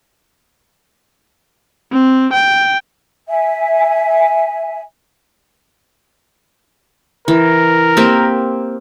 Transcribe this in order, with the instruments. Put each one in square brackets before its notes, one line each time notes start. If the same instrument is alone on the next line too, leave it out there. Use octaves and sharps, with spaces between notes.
[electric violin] C4
G5
[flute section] E5 G#5
[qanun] E3 [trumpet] A#4
[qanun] A#3 C4 G4